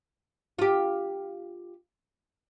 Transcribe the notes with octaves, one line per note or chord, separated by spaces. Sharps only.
F4 G4